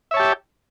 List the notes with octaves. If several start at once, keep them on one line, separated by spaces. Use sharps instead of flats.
G4 C#5 E5 A5